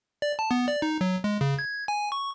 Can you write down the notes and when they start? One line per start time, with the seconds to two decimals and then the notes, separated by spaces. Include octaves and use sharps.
0.22 D5
0.39 A5
0.51 B3
0.68 D5
0.82 D#4
1.01 F#3
1.24 G#3
1.41 C#3
1.59 G#6
1.88 G#5
2.12 C#6